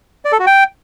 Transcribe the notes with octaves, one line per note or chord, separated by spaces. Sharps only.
D5
A4
F#4
G5